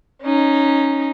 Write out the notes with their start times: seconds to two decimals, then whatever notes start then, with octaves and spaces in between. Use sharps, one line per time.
0.24 C#4 D#4